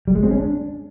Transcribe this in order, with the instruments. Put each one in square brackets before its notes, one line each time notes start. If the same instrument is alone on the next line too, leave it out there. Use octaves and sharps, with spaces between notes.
[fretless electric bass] G3
G#3
C4
C#4
D4